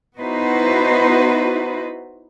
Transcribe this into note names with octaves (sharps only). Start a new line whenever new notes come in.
B3 D#4 E4 F#4 B4 C5